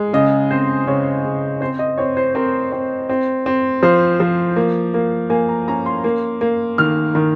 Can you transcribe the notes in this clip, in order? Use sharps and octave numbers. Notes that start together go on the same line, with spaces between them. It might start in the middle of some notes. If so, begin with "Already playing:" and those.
Already playing: G#3
C#3 D#5
C4 C5
C#3 C#5
C#3
C4 C5
D#5
C4 C#5
C5
C4 A#4
C4
C4
C4
F3 C5
F3
A#3
A#3
A#3 G#5
A#5
C#4 A#5
C6
A#3
A#3
D#3 F6
D#3